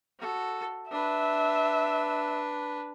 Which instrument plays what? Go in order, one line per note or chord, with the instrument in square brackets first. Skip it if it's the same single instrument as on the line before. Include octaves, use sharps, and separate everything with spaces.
[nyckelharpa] F#4 A4
[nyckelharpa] D4 B4 [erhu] E5